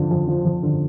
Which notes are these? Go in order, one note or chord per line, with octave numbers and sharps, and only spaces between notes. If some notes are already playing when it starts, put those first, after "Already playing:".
Already playing: F2 D3 F3
F2
F3
F2
D3